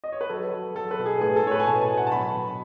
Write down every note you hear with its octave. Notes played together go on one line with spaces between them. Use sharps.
D#5
C#5
B4
F#3 A4
F#3
F#3 A4
B4
B2
G#4
A2 G#4
A4
A2 C#5
B4
G#5
B2 A5
G#5
B2
F#5
A5
F#3 B5
B2